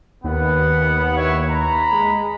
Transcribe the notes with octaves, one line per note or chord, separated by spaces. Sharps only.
D#2 B3 F#5
E4 B4 C#5
A#5 B5
G#3